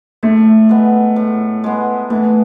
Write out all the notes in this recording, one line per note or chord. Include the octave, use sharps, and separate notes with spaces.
A2 A3
G#3 B3
A2
G#3 B3
E3 A3